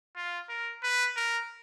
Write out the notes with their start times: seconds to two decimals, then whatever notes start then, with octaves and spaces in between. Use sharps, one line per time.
0.16 F4
0.49 A#4
0.83 B4
1.16 A#4